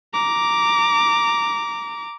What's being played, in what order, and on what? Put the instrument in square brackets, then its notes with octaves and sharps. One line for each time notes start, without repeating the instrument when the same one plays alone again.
[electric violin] A#5 D6